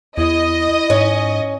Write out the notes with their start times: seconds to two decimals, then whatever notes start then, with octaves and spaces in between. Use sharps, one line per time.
0.17 E2 E4 D#5
0.90 G#2 C#4